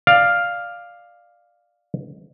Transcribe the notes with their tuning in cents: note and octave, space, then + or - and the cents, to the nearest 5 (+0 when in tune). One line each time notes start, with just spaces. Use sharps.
D5 +15 F5 +5